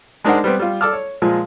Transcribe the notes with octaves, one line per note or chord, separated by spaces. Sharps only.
G#3 D4 D#4 A#4 C5 F#5
G3 B3 C4
G3 F4
A4 D5 A5 D6 E6 F6
C#5
A#2 F3 G#3